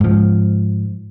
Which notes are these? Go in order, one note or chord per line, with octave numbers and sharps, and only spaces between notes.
G#2 F3